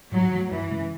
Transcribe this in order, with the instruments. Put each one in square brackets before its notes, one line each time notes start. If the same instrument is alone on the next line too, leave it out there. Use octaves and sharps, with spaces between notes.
[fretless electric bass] G#2 [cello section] F#3
[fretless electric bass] E3 A3
[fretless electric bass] F#2 [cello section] E3
[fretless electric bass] C#3 G#3 C#4